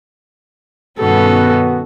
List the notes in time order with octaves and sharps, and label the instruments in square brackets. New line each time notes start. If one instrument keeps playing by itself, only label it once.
[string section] G2 B2 C#4 [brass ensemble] D#3 B3 F#4 [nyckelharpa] A4